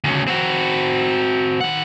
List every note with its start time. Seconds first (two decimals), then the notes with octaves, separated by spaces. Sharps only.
0.04 D2 C#3
0.28 C4 F#4
1.61 D#3 F#5